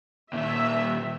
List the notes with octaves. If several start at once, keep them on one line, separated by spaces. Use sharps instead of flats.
A#2 D#3 E5